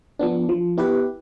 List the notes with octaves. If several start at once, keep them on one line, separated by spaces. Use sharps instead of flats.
F3 B3 D4
F3
B3 E4 G4 B4